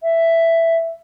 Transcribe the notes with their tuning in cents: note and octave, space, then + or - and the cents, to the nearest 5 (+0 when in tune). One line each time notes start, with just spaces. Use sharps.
E5 +5